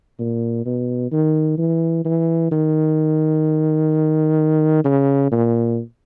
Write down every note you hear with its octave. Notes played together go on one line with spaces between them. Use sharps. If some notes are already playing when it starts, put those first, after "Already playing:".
A#2
B2
D#3
E3
E3
D#3
C#3
A#2